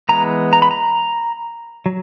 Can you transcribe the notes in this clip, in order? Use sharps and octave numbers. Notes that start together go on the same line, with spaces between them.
E3 G#3 B3 A#5
A#5
B5
A#5
F#3